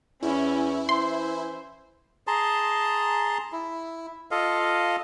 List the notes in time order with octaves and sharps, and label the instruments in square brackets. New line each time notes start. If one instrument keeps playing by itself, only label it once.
[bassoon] E2 [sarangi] C#4 [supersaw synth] E4
[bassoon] E3 [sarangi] C5 [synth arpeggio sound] C6
[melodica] G#4 A5 A#5 C6
E4
F4 A4 D#5 F5